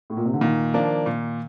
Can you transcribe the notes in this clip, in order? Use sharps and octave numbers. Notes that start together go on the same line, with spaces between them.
A2
A#2
C3
D3
A#2 D#3
F3 A#3 D4
A#2